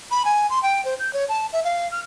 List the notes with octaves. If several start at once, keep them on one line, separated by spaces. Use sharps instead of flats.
B5
G#5
C6
G5
C5
G6
C#5
A5
E5
F5
F6